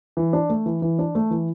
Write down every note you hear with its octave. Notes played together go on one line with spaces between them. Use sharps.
E3
D4
A3
E3
E3
D4
A3
E3